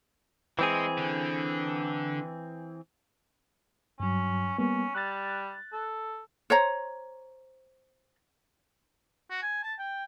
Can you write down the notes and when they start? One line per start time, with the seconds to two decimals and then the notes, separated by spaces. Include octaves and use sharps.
0.59 E3 G#3 C4 G#4
0.98 D3
4.00 G2 F#3 C#4
4.58 G3 A#3 B3 C#4
4.95 G3 F#6 A6
5.73 A4
6.50 C5 C#5 A#5
9.30 F#4
9.42 G#5
9.63 A5
9.79 G5